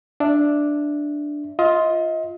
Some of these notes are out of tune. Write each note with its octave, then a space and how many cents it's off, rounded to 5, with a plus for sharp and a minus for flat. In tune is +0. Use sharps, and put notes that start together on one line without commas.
D4 +0 E5 +0
F4 +0 D#5 +35